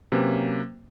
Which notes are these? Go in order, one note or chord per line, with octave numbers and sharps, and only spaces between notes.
C3 F#3 A#3 C#4 B4 C5